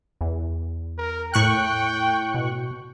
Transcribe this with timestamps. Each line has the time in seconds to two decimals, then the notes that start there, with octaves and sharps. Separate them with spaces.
0.21 E2
0.98 A#4
1.34 A2 G5 C#6 F#6
2.34 B2